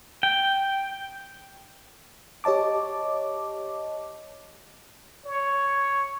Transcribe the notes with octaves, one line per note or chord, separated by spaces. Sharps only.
G5
G4 C#5 D#5 A5 D6
C#5